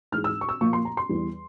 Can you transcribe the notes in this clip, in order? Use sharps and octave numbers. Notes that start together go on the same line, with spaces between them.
G#2 E3 G#3 F6
E6
C#6
E6
A#2 F3 A#3 C#6
C6
A#5
C6
E2 E3 G3